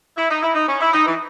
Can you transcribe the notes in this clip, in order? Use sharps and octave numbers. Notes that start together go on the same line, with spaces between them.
E4
D#4
E4
D#4
C#4
E4
D#4
E3